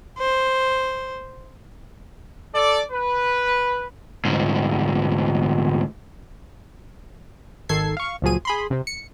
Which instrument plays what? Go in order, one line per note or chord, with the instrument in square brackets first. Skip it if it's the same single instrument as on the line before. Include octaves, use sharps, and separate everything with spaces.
[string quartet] C5
[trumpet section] A4 D5
B4
[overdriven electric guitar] D2 G#2
[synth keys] G#1 D#3 A4 G#6 C7
F5 C#6
C#2 A#2 F3 F#3 G#4 D#7
G#4 B5 C6
C3 C4
C#7